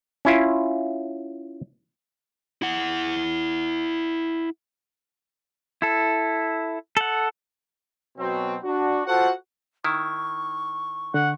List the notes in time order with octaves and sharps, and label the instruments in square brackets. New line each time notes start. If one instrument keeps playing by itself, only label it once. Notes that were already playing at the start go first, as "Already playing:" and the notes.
[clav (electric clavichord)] C#4 E4 F4
[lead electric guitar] E4 F#5
[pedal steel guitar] E4 A4
A4 F#5
[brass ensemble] B2 F#3 C4
D4 F#4
F4 F#4 A4 C5 F#5
[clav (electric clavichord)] D#3 E4 [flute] C#6
[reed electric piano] D3 [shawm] F#5